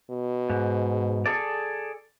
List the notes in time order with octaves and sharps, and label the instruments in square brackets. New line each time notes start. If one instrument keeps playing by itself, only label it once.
[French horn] B2
[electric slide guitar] G#2
G#4 A4 D5